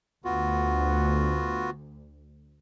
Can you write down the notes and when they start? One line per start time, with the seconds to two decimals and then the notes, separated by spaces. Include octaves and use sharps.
0.25 D2 B3 F4 F#4